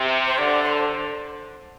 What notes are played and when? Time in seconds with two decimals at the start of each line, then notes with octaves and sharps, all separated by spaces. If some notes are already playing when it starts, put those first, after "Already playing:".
Already playing: C3
0.27 C5
0.38 D3 D5
0.63 C5